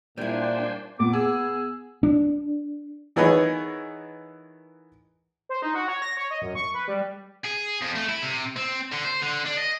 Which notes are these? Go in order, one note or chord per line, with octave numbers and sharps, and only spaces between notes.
A#2 G3 D4 E4 C5 G5 G#5
A#2 B3 D6
G#4 E6
D4
D#3 E3 B3 G#4 C#5 D#5
C5
D#4
F#4
C#5
A#6
C#5
D#5
F#2
C#6
B4
G3
G#4
F2
A3
E4
C3
C4
D3
C5
D3
D4
D#5